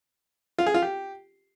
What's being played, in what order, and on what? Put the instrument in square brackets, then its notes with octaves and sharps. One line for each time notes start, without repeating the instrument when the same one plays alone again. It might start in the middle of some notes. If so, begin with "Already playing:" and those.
[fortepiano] F4
G#4
F4
G4